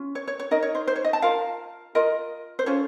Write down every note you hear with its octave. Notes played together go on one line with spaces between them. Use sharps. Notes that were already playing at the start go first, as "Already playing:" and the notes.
Already playing: C#4 F4
C#5
C#5
C#5
D#4 A#4 D#5
C#5
C5
C5
C#5
D#5
A5
F4 A#4 F5
F4 A#4 D#5
C5
C#4 F4 A4 C#5